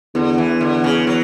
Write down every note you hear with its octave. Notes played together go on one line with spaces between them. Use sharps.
E2 D3
E3
D3
C#3
F#3